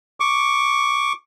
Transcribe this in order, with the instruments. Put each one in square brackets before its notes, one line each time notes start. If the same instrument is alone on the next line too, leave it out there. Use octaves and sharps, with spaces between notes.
[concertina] C#6 D6